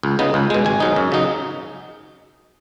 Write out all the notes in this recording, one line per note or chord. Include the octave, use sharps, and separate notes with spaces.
C#2
C#3 B3 D#4
C#2
B2 G#3
G#1 G#5
G#2 F#3 D#4
F#2
C#3 F#3 D#4